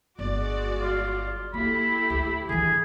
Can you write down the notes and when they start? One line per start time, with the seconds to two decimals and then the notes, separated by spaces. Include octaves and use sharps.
0.19 G1 G#3 F#4 D5
0.81 F4
1.54 A#3 E4 G4 A4 B5
2.10 D2
2.49 D3 E3 G#4